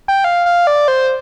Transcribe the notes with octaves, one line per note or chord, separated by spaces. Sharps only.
G5
F5
F5
D5
C5